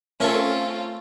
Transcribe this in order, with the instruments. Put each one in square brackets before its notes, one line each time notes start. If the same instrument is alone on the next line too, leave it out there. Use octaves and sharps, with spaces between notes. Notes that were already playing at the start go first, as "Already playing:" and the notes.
[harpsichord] A3 A#4 C#6 [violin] C4 F4 [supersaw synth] C#4 A4